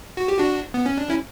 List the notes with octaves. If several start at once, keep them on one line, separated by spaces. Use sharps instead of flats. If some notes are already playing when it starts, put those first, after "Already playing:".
F#4
G4
D4 F#4
B3
C#4
D4
C#4 E4